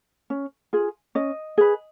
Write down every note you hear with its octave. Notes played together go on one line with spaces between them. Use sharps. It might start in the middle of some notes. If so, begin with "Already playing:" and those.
C#4
F4 G#4
C#4 D#5
G#4 B4